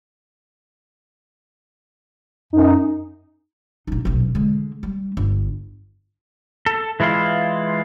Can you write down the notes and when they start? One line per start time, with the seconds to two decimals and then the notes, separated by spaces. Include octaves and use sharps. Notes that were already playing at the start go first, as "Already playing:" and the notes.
2.53 F#2 D#4
3.87 A#1 D#4
4.05 D#1 B1
4.35 D3 G#3
4.83 G3
5.17 G1
6.66 A4
7.00 E3 G#3 E4 F4 F5